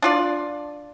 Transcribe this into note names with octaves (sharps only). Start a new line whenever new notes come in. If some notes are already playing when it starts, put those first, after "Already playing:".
D4 F4 D5